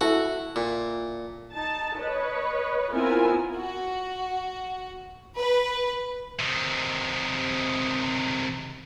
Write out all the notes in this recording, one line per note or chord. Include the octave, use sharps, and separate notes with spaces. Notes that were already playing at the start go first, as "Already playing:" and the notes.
E4 F#4 A4
A#2
D#4 A5
B4 C#5 D#5
B3 C4 E4 F4 A#4 G#5
F#4
B4
C3 D#3